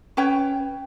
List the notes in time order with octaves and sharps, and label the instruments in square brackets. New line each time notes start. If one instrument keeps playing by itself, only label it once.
[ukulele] C#4 B4 C#5 G5